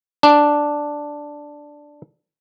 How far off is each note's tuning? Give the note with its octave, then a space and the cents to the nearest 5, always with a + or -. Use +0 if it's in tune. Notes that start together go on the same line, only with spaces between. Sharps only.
D4 +0